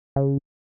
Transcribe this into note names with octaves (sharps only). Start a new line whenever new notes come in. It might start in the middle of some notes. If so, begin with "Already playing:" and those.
C#3